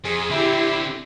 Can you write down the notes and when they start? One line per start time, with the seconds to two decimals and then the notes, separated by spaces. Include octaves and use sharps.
0.05 F2 G#4
0.31 D3 C4 E4 G4